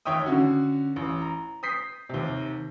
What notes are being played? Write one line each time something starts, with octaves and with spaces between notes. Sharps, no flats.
D#2 C#5 E5 G5 D#6
D3 C#4 F#4
A1
A#5
D#6 G6 B6 C7
D#2 C3